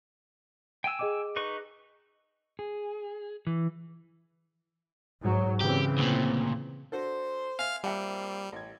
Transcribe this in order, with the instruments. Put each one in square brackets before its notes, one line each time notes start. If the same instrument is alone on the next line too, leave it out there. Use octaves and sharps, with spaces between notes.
[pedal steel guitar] G5 G#5 E6
[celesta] G#4 D#5 D6
[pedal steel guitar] D#4 B4 C#6
[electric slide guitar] G#4
E3
[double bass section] G#2 F#3
[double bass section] C#3 E3 C4 [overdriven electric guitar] G4
[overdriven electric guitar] D2 A#2
[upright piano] D4 F#4 A4 [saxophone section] C5
[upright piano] E5 G#5 [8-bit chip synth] F5 F6
[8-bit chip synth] G3 [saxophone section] A#3 C4 F4 [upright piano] E5 F#5 A5
[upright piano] A1 G#6